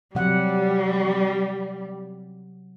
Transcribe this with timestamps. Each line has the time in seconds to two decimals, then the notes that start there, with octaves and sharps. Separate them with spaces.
0.15 C3 F#3 G3 F#5